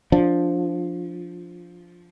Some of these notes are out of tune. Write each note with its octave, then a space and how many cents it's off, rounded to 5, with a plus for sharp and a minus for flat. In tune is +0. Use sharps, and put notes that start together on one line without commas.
F3 +5 D4 -5